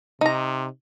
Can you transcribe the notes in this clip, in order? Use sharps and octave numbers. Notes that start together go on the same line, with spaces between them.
C3 D#4 A#5